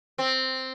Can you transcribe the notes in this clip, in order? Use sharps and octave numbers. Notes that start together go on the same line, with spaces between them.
C4